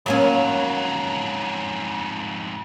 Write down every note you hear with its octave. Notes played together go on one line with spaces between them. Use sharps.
F2 G#2 F#3 A#3 C#4